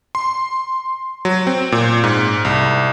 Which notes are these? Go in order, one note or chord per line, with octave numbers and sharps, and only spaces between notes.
C6
F#3
C4
A#2
G#2
C2